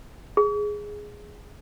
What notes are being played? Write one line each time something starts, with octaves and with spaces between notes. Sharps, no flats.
G#4